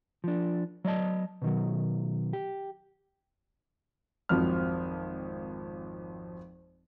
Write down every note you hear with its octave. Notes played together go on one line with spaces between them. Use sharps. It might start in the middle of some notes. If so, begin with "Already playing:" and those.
F3 D4
F#3 D5 D#5 A5
B2 D#3 F#3
G4
G#1 F2 F3 F#3 F6